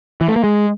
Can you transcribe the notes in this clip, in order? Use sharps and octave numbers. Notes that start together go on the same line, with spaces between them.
E3
A3
A#3
G#3